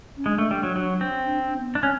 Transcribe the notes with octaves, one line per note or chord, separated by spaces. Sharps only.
C#4
G#3 D4
A3
G3
F#3
F#3
C4
D4
D4
B3
C4 D4
C#4